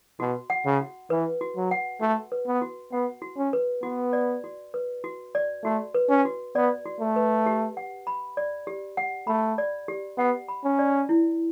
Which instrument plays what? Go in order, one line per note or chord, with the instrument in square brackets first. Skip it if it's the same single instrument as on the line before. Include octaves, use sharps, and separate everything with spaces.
[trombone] B2 [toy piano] F#4
[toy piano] F#5
[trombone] C#3
[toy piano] F#4
[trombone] E3 [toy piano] B4
[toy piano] F#4
[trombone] F#3
[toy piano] F#5
[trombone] A3 [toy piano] F#4
[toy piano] B4
[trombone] B3
[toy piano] F#4
[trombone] B3 [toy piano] F#5
[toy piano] F#4
[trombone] C#4
[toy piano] B4
[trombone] B3 [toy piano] F#4
[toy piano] D5
F#4
B4
F#4
D5
[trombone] A3 [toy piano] F#4
[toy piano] B4
[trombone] C#4
[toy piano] F#4
[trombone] B3 [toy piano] D5
[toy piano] F#4
[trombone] A3
[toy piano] B4
G4
F#5
B5
D5
G4
F#5
[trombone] A3 [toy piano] B5
[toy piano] D5
G4
[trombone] B3 [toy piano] F#5
[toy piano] B5
[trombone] C#4
[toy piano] D5
E4